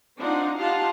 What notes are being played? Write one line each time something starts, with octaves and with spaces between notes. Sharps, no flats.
C4 D4 D#4 F4 F#5
D#4 F4 G4 F5 F#5 A5